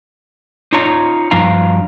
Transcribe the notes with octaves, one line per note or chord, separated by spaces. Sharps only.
D#4 F4 C#5 A#5
G2 F3 D4 F5 A#5